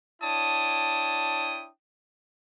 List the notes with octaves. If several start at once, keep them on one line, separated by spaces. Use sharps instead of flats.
D4 E4 C#5 G5 A5 D#6